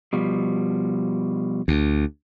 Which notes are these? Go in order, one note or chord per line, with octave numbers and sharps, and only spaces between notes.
B2 F3 G3
D2